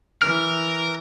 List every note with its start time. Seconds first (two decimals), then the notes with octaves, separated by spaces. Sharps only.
0.22 E3 A#4 F6